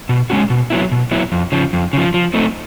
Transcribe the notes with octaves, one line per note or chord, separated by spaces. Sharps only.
B2
G#3 C#4 F#4
B2
F#3 B3 E4
B2
F#3 B3 E4
F2
C#3 F3
F2
C#3 F3
F3
A3 C4 D#4